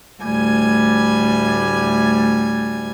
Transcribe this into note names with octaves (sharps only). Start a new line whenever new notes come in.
D2 A2 G3 G#5 G#6